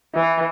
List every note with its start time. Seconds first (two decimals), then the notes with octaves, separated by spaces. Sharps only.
0.15 E3